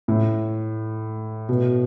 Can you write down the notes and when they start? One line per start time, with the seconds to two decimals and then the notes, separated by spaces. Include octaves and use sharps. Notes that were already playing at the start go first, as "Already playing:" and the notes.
0.08 A2
1.49 B2